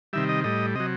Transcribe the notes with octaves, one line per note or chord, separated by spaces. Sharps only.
C3 D#3 G3 E5
D#5
A2 G3 D#5
C3 F#3 D#5